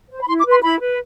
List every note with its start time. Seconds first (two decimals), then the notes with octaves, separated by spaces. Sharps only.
0.11 C5
0.23 B5
0.27 E4 C6
0.39 D6
0.45 B4
0.51 C6
0.62 E4 B5
0.80 B4